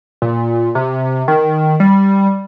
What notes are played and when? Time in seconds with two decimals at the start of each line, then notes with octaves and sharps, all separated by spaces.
0.22 A#2
0.75 C3
1.28 D#3
1.80 G3